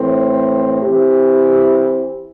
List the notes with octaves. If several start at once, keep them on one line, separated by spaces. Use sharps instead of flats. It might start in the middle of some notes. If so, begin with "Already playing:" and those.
Already playing: A2 E3 C4
E3 C4 E4 G4